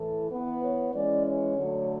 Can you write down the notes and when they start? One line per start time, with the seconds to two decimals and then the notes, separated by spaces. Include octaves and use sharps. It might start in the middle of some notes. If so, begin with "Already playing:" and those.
Already playing: A2 E3 A4
0.29 E3 B3 B4
0.60 C#5
0.92 E3 G#3 C#4 D5
1.24 C#5
1.56 D3 F#3 A3